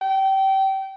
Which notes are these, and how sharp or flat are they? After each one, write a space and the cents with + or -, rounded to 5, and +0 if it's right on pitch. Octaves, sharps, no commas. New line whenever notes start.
G5 -25